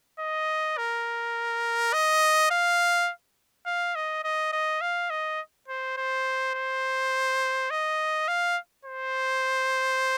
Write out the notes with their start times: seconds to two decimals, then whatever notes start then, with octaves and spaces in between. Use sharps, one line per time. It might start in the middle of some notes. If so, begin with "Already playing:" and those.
0.19 D#5
0.77 A#4
1.93 D#5
2.50 F5
3.66 F5
3.95 D#5
4.23 D#5
4.53 D#5
4.81 F5
5.10 D#5
5.68 C5
5.97 C5
6.54 C5
7.70 D#5
8.28 F5
8.85 C5